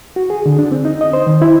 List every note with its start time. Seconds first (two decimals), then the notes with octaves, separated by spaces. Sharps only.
0.16 F#4
0.30 G#4
0.46 D3
0.59 D4
0.72 C4
0.85 D#4
1.01 D#5
1.13 C5
1.27 D#3
1.42 E4